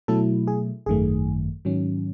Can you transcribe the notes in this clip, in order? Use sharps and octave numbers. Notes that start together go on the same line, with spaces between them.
B2 F#3 A3 E4 A4
G#4
G#1 F#2 D#3 A3 G#4
G#2 D#3 F#3 C#4